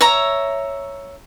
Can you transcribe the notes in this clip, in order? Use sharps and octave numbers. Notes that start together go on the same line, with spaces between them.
C#5 E5 A#5